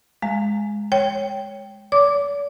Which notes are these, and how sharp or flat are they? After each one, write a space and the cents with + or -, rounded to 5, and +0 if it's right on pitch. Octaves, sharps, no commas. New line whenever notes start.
G#3 +0 F5 -15 A#5 -30
C#5 +0 G5 +0
D5 -45 D6 +0